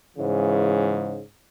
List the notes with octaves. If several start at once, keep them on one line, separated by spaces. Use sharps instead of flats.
G#2 C#3 E3